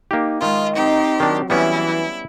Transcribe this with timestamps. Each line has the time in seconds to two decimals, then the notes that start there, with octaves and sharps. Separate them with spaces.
0.11 A#3 D#4 G4
0.42 D#3 G#3 F4 D#5
0.75 C4 D#4 G4
1.20 D#3 F#3 D4
1.50 E3 G3 B3 C#4 E4